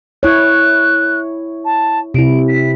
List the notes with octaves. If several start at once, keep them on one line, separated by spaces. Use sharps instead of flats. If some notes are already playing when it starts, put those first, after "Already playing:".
E4 C#5 F#6
A5
C3 E4 D7
B6